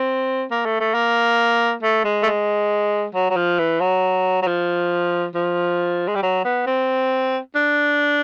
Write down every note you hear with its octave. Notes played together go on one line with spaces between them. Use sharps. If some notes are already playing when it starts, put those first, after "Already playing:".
Already playing: C4
A#3
A3
A3
A#3
A3
G#3
A3
G#3
F#3
F#3
F3
E3
F#3
F#3
F3
F3
G#3
G3
F#3
B3
C4
D4